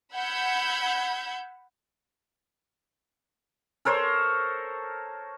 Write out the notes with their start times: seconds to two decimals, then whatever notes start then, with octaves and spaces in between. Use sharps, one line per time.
0.14 F#5 B5 E6 G6 G#6
3.85 A4 A#4 C5 C#5